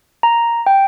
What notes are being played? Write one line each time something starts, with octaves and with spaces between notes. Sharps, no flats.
A#5
G5